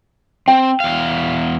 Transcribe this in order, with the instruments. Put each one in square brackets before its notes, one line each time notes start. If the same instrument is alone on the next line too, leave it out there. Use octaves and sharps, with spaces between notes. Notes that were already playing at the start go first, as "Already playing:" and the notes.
[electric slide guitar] C4 [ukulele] G5
[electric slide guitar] E2 F5